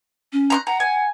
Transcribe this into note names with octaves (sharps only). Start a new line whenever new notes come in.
C#4
A#5 C6 F#6
F#5 A#5
G#5